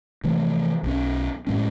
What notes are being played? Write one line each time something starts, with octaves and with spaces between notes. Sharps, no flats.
C3 E3 F3 A3
B1 C#4
A2 G#3 C#4